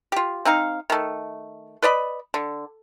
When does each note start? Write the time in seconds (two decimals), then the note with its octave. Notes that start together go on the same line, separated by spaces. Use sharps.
0.12 F4 G4
0.45 C4 D#4 F5
0.90 D#3 A3
1.82 B4 D5 D#5 B5
2.34 D3